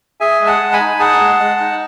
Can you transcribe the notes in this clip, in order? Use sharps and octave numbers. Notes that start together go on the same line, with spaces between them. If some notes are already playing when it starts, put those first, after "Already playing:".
G#4 E5 G#5
G#3
F#5 A5
G#3
G#5 B5
D#4
G#4 F#5 A5
G#3
G#3
D#4